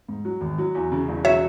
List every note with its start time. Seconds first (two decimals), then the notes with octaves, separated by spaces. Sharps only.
0.08 G#2
0.25 F#3
0.41 G#1
0.58 F#3
0.75 E2
0.92 C#3
1.08 E1
1.24 F#3 C#5 E5